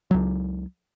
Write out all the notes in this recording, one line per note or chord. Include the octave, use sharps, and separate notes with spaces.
C#2 F#3